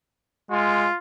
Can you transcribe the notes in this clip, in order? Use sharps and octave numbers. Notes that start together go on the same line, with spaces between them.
G#3 F4